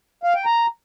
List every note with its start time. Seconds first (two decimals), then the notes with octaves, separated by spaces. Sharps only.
0.23 F5
0.34 G5
0.45 A#5